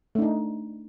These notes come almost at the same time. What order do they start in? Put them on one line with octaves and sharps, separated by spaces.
A3 D4 D#4